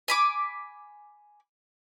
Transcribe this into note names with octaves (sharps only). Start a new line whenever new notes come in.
G#5 B5 D6